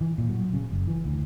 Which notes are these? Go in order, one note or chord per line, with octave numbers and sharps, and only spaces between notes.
E3
A#2
F#3
C#3
F#1
E3
D2